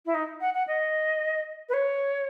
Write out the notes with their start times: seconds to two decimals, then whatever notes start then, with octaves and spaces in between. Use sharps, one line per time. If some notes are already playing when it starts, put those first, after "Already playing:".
0.06 E4
0.14 D#4
0.41 F#5
0.54 F#5
0.68 D#5
1.69 B4
1.74 C#5